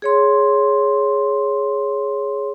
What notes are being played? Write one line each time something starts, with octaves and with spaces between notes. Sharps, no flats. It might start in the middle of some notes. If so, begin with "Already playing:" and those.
G#4 C#5 C6